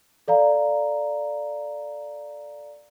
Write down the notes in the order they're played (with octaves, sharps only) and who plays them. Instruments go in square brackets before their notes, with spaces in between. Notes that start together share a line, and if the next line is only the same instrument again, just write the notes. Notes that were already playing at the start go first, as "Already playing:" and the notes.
[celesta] A4 D5 F5 A#5